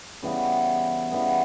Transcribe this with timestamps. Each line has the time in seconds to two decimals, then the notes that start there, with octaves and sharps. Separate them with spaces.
0.23 C#3 E3 G3 B3
1.12 C#3 E3 G3 B3